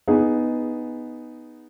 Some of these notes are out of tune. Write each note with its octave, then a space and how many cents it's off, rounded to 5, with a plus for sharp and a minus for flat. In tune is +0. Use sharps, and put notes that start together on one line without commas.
B3 +0 D#4 +0 G#4 +0